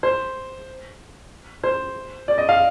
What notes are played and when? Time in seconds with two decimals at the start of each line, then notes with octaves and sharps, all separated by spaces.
0.03 C5
1.63 C5
2.28 D5
2.38 D#5
2.49 F5